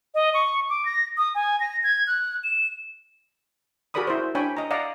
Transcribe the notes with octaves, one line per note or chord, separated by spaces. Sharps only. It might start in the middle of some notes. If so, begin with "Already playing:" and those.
D#5
C#6
D6
A#6
D#6
G#5
A#6
G#6
F#6
E7
F#4 G#4 A#4 D5 B5 D#6
E4 F#4 C5
D4 C#5 G5 G#5 B5
D#5 A#5
D5 D#5 F5 F#5 A#5